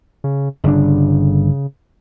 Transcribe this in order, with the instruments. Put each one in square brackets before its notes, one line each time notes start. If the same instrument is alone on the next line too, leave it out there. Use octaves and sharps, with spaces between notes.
[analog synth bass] C#3
[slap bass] G1 D4 [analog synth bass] C#3